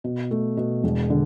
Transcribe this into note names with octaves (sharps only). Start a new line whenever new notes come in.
B2
A3
B2
E1
D3